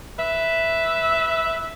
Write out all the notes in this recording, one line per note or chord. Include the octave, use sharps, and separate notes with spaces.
B4 E5